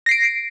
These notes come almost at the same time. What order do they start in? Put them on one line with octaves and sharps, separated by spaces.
A#6 C7 D7